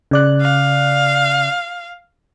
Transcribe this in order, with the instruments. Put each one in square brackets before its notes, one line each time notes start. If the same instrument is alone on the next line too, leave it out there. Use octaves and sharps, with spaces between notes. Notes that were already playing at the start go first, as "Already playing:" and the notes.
[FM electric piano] C#3 D5 F#6
[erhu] F5